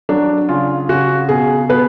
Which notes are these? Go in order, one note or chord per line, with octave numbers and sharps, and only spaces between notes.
F#3 D4
C#3 F4
C#3 F#4
B2 G#4
B2 B4